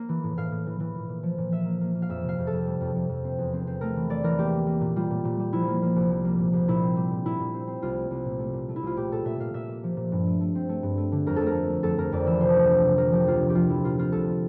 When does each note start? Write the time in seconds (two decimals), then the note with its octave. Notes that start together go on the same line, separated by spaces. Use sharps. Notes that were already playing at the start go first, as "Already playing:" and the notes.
Already playing: A#3
0.09 E3
0.24 A2
0.37 A2 F5
0.51 A2
0.67 E3
0.80 E3
0.95 A#2
1.09 A#2
1.23 F3
1.38 A#2
1.52 F3 E5
1.66 A#3
1.81 A#3
1.95 A#3
2.02 F5
2.09 F2 E5
2.23 C3
2.29 F5
2.38 F2
2.47 A4
2.52 F2
2.67 G3
2.80 F2
2.95 F2
3.09 F2
3.24 C4
3.38 E2
3.53 C4
3.67 C4
3.81 A3 A#4
3.96 E3
4.09 A3 D5
4.24 E3 A#4
4.38 A#3 G4
4.53 A#3
4.67 A#3
4.81 A#2
4.96 G3 F4
5.11 A#2
5.25 A#2
5.39 G3
5.53 F3 E4
5.68 A#3
5.82 A#3
5.96 C2
6.11 F3
6.24 A#3
6.39 A#2
6.53 C2
6.68 A#2 E4
6.82 C4
6.96 G3
7.11 A#2
7.25 A#2 E4
7.40 A#2
7.54 C4
7.67 C4
7.82 C2 F4
7.97 A3
8.11 C2
8.25 A#2
8.39 A3
8.53 A#2
8.69 A3
8.76 E4
8.83 C2 F4
8.97 A#2 G4
9.12 A#2 A4
9.25 A#2 E5
9.40 A#2 F5
9.54 A#2 E5
9.69 A#3
9.84 F3
9.97 A#2
10.12 G2
10.27 A3
10.41 A3
10.55 C4
10.69 A3
10.83 G2
10.97 A3
11.12 D3
11.26 F2 A#4
11.36 A4
11.41 A3
11.46 A#4
11.54 A3
11.69 A3
11.83 F2 A4
11.98 F2 A#4
12.12 F2 D5
12.26 E3 E5
12.40 C3 C5
12.55 D2
12.69 C4
12.84 C3
12.98 F3 A#4
13.12 F3 G4
13.27 D2 F4
13.41 C3
13.49 G4
13.55 F3 F4
13.69 F3 E4
13.84 A#2 F4
13.98 C4 F4
14.12 C2 A4